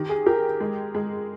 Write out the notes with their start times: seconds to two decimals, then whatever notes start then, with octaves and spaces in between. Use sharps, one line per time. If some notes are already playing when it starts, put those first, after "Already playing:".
Already playing: D#3 G4
0.09 G#4
0.26 G4 A#4
0.60 G#3
0.95 G#3